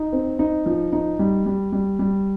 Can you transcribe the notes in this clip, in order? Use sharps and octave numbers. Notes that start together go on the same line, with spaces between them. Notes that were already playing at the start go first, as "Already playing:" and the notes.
Already playing: D#4
C4
D#4
F3
D#4
G3
G3
G3
G3